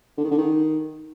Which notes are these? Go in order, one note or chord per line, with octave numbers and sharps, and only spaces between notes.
D3
D#3
D3
D#3